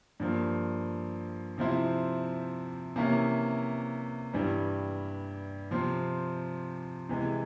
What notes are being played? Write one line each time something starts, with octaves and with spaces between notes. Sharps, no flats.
G2 F3 A#3
C3 F3 C4 E4
C3 E3 A#3 C#4 E4
G2 E3 G3
C3 F3 C4
C3 E3 G#3